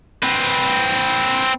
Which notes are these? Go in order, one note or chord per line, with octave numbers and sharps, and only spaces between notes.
C4 B4